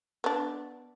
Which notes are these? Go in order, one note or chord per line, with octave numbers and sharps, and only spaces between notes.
B3 D4